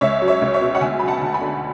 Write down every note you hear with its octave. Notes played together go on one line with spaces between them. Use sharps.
C#2 C#5 E5
F#3
C#5 E5
C#2
C#5 E5
B2
F#5
D2 E5 G#5
F#3 B5
F#5 A5
D2 A5
G#5 B5
D3